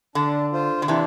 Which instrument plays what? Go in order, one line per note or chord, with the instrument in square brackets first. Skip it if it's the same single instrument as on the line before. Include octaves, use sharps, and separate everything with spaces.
[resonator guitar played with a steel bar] D3 [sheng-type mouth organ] D4
[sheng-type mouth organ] F4 C5
[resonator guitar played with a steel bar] D3
[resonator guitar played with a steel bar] C3 E3 [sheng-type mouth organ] D4